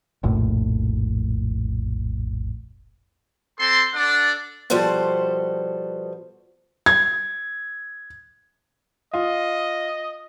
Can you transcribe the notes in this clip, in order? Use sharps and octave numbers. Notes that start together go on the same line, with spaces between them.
F1 A#1 A2
C4 A4 C6
D4 A4 D5 F#5
B2 F3 G3 A4 C5 F#5
G#6
F4 D#5